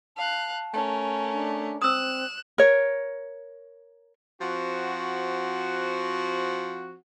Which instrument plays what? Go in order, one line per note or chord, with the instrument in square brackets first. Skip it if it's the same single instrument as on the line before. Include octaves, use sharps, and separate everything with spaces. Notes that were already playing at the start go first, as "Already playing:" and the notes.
[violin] F5 F#6 [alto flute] A5
[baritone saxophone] A3 [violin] C#4 A#4
[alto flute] D4
[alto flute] C4 [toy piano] D#6 E6 [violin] F#6 E7
[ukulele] A#4 C#5
[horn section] F3 C4 F#4